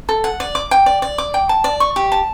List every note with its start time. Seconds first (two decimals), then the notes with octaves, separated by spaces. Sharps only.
0.09 A4
0.24 F#5
0.40 D5
0.55 D6
0.71 G5
0.86 D5
1.02 D5
1.18 D6
1.34 G5
1.49 A5
1.64 D5
1.80 C#6
1.96 G4
2.12 A5